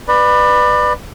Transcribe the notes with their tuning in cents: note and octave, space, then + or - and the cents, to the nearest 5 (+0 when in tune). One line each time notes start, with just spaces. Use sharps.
B4 +0 D5 +25